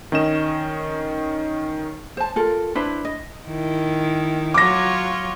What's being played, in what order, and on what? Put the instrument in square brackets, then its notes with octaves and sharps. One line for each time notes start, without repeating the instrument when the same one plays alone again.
[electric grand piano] D#3 C#4 D#5 E7
[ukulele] C5 A5
F4 A4 A#4
D4 E4 B4 C5
D#5
[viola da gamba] D#3 E4
[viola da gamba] F#3 F4 C#5 [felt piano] D6 A#6